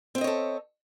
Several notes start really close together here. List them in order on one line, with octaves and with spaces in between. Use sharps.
C4 E5 D#5 C#5 A4